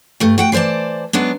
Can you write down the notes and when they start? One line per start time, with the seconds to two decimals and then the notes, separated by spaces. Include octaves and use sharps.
0.20 G2 A3
0.38 F#4 F#5 G5
0.52 E3 B4 C5 D5 A5
1.13 F#3 G#3 B3 D4